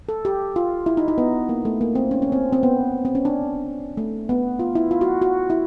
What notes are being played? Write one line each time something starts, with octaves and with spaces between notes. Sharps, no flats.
A4
G4
F4
E4
D#4
D#4
B3
A#3
A3
A#3
C4
C#4
C#4
C4
C4
B3
C4
C#4
D4
A3
B3
F4
E4
F4
F#4
F#4
E4